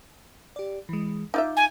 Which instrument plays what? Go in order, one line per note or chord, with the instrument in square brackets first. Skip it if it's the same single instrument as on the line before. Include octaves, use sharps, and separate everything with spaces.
[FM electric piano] G4 D5
E3 G#3
[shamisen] D#4 F4 E5 [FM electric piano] D6 G6
[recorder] G#5